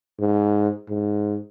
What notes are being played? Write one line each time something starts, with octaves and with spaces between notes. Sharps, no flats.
G#2
G#2